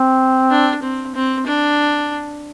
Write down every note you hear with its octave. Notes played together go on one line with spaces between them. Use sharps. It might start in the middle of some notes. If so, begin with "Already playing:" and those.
Already playing: C4
D4
C4
C4
D4